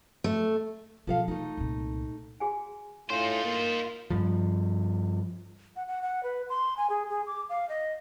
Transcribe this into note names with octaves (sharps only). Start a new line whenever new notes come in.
A3
B2 F3 A4 F5
E3 A3 D#4
C2 A#2
F#4 G#4 G#5
A2 D4 D#4 F4 C5 C#5 C6
A#3
G2 F3
F#5
F#5
F#5
B4
C6
G#5
G#4
G#4
D6
F5
D#5